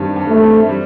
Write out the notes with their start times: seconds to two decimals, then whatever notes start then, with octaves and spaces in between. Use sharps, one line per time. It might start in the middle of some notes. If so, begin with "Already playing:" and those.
Already playing: G2 D#3 G3 C4
0.16 G2
0.29 A3
0.42 C4
0.69 G3